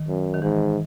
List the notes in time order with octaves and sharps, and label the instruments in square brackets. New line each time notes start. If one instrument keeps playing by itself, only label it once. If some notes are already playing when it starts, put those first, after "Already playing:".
Already playing: [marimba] D#3
[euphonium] F#2
[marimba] D#3
[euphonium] G#2 [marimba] E3